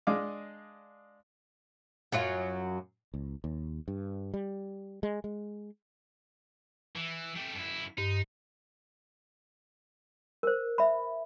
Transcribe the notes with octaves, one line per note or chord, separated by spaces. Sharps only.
G#3 D4 D#5 F5 D6
F#2 F#3 F4
C#2
D#2
G2
G3
G#3
G#3
E3
A3 G4
F#2 E4
G2 D#4
A#4 C5
E5 B5